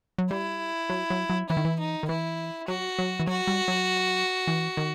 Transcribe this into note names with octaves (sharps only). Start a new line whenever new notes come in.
F#3
G3 E4
F#3
F#3
F#3
E3 E4
D#3
E3
D#4
D#3
E3 E4
F#3 F#4
F#3
E3
F#3 F#4
G3
F#3
E3
D#3